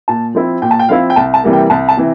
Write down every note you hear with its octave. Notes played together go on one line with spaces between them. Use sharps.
A#2 A5
F3 C4 E4
A#2 G5
A5
G5
F3 C4 E4 F5
G5
C2 A5
A5
C3 E3 G3 A#3
G5
C2 A5
A5
C3 E3